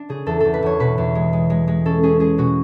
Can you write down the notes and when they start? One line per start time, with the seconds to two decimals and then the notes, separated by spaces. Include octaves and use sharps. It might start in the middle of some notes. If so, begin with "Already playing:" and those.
Already playing: D4
0.09 C#3 G#4
0.26 E2 A4
0.40 E2 A4
0.54 B4
0.63 E2 C#5
0.80 B2 B4
0.98 E2
1.15 G#3
1.33 G#3
1.50 G#3
1.68 G#3
1.85 C#4 A4
2.03 C#4 G#4
2.20 G#3 G#4
2.38 B2 F#4